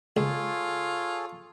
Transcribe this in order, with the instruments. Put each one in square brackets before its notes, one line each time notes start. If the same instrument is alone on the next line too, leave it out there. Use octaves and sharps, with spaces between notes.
[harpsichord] C#2 [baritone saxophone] F4 [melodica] G#4 A4 C#5